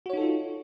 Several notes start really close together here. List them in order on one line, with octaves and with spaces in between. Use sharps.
F#4 C#5 D#4 A4 F4